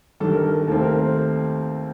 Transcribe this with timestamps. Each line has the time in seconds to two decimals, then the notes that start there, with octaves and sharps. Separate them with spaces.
0.20 G1 G2 D#3 A4
0.32 A#4
0.44 A#4
0.68 D#2 D#3 A3 C4 A4
0.83 A#4
0.99 C5